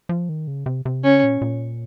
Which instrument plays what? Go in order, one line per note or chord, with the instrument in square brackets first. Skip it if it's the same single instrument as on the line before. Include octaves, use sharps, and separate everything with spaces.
[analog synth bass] F3
D#3
C#3
C3
C3
[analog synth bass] C#3 [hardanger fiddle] C#4
[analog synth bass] A#2
A#2